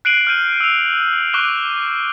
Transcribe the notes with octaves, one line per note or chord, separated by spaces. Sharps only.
F#6 C7 D7 D#7 F#7
F6 G6 D#7
E6 F7
C#6 D6 F#6 G7